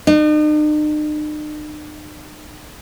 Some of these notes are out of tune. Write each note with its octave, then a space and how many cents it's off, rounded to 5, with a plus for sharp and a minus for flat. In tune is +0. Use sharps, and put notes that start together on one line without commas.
D#4 -45